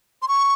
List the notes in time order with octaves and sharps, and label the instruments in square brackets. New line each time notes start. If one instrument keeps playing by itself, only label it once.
[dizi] C6
C#6